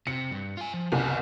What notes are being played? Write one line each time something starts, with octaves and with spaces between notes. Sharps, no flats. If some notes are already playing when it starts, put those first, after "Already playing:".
C3 C#7
G2
F4 G#5
F3
F#1 C2 B3 G#5